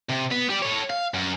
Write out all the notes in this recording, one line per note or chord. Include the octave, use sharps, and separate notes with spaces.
C3
B3
G4 D5
A4 C#5
F5
F#2